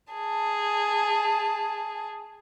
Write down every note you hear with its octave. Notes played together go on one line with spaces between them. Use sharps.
G#4 A5